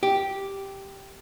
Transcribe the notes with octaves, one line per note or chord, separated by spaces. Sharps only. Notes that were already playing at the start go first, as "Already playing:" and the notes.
G4